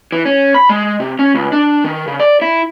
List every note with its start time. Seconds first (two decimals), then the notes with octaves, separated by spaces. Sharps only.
0.12 E3
0.26 C#4
0.54 B5
0.69 G#3
1.00 C3
1.19 C#4
1.35 C#2
1.52 D4
1.84 D#3
2.07 C#3
2.20 D5
2.42 E4